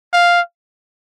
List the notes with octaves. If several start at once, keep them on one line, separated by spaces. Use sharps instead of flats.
F5